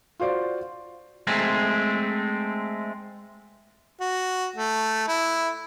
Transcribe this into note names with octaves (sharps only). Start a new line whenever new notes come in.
F4 F#4 C5 D5
G#3 A3 C4
F#4
A3
E4